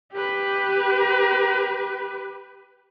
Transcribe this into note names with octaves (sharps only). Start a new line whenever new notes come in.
G4 B4